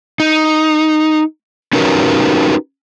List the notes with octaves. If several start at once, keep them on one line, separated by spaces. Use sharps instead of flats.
D#4
C#4 D#4 F#4 G4 A#4 B4